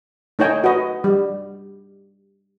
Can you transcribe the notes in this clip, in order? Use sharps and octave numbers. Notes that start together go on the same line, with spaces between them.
A3 D#4 C#5 G5 G#5
F#4 B4 D#5
G3